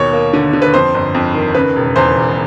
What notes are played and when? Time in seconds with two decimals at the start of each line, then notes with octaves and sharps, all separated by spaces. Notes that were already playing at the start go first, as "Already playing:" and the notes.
Already playing: D#2 B2 C#5
0.13 A#3
0.33 D3
0.53 D3
0.62 B4
0.74 F2 C5
0.94 G1
1.15 F2
1.35 D#3
1.55 C#3 B4
1.76 E1
1.96 E2 C5
2.17 E1